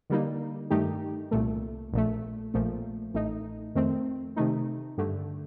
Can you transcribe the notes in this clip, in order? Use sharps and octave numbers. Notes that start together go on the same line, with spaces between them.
D3 G3 A#3 D#4
G2 D#3 A3 D#4 G4
C2 A#2 A3
A#1 A#2 A3
A#1 A#2 F3 A3
A1 A2 A3 D#4
F2 D#3 A3 C4
C3 D#3 A3 D#4
G2 D3 A3